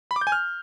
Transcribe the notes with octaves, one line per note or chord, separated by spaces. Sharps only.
B5
D6
G6
G#5
F6